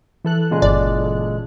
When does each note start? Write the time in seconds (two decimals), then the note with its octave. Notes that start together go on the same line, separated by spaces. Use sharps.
0.25 E3 A4 F#6
0.51 A#2 C#3 G#3
0.62 G1 D5